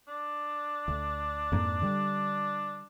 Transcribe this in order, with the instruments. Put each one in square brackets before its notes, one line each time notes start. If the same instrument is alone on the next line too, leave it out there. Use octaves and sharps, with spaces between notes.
[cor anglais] D4
[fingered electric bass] D2
F2 G#2 A#3
D3 G3